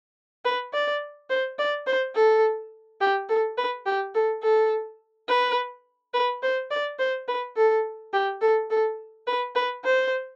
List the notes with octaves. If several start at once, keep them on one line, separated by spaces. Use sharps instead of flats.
B4
D5
C5
D5
C5
A4
G4
A4
B4
G4
A4
A4
B4
B4
C5
D5
C5
B4
A4
G4
A4
A4
B4
B4
C5